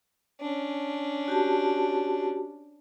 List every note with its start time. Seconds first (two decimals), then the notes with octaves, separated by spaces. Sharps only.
0.41 C#4 D4
1.28 F#4 G4 A5